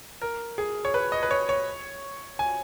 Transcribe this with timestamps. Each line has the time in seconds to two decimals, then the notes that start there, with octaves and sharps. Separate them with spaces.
0.22 A#4
0.58 G#4
0.85 C#5
0.94 B4
1.12 D#5
1.23 B4
1.31 C#5
1.49 C#5
2.39 G#5